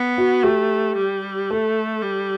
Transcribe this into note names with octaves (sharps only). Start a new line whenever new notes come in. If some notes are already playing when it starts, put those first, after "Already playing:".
Already playing: B3
F#4
A3 G4
G3
A3 A4
G3